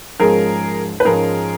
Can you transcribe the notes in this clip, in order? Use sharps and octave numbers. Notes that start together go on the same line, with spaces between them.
G#2 F3 G#3 C#4 G#4 A#4
B4
G#2 F3 G#3 C#4 G#4 A#4